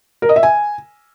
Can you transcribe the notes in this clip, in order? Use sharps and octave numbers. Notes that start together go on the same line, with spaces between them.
A#4
D#5
E5
G#5